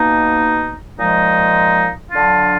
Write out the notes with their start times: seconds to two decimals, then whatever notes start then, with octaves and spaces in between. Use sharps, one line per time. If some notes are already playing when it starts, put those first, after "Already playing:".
Already playing: B2 A#3 D#4
0.97 A#2 F3 G#3 D#4
2.11 D3 F#3 D4 F4